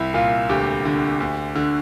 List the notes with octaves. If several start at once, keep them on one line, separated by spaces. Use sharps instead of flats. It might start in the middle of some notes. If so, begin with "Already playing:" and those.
Already playing: C2 E4
A#2 F4
D2 G4
D3
D2
D3